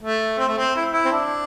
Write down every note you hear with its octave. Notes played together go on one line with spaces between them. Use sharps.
A3
C4
A3
C4
E4
E4
C4
D4